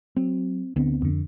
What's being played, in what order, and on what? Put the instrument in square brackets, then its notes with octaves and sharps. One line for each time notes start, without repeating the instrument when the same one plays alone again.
[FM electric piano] F#3 [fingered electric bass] C4
[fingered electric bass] D2 B3 C4 [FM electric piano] D3
[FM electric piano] F2 D3